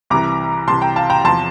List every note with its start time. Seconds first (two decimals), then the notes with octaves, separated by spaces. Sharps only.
0.10 C2 C3 E3 A#5 D6
0.67 C2 C3 E3 A5 C6
0.81 G5 A#5
0.96 F5 A5
1.10 G5 A#5
1.24 E2 C3 F3 A5 C6